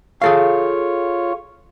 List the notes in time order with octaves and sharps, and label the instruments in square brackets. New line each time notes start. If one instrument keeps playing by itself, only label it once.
[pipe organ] F4 C#5 [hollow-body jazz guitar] G#4 A4 F5